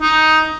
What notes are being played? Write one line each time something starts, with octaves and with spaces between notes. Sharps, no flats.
D#4